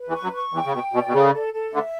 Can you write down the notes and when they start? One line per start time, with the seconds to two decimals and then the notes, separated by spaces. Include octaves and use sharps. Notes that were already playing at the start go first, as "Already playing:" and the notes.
Already playing: B4
0.08 E2 E3
0.14 C#6
0.23 F#2 F#3
0.33 C#6
0.53 E2 E3 G5
0.65 C#3
0.73 B2 G5
0.93 B2 D5
1.07 B2
1.13 C#3 A4
1.33 A4
1.53 A4
1.73 D2 D3 E5